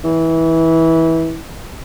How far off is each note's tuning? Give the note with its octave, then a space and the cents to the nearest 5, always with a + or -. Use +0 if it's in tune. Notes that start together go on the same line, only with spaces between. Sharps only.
E3 -20